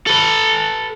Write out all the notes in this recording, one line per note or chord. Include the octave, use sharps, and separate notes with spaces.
A4 B4